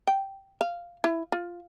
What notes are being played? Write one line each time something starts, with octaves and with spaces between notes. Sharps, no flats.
G5
F5
E4
F4